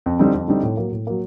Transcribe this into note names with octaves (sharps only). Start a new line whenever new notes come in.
F2
D3 G3 C4 D#4
F2
D3 G3 C4 D#4
A2
F#3 A#3
A2
F#3 A#3